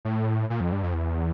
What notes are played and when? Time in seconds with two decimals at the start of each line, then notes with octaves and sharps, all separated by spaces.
0.05 A2
0.50 A#2
0.61 F2
0.72 G2
0.83 F2
0.94 E2